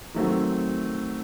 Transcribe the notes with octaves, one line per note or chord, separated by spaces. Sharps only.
D#3 F#3 A3 C4